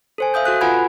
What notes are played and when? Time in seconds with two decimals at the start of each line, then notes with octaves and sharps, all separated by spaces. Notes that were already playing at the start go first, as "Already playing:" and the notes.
0.18 A4 C5 G#5
0.34 E5 F5 D#6 G6
0.45 F#4 A4 F#6
0.61 F4 B4 F#5 G#5 B5 G#6